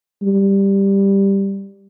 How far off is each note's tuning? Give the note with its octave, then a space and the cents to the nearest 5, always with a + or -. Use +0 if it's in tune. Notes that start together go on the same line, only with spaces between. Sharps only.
G3 +5